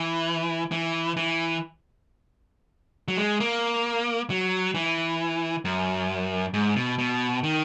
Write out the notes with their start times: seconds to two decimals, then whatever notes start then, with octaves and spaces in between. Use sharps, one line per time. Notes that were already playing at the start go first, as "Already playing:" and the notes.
Already playing: E3
0.72 E3
1.17 E3
3.08 F#3
3.17 G#3
3.40 A#3
4.30 F#3
4.74 E3
5.65 F#2
6.54 G#2
6.76 B2
6.98 B2
7.44 D#3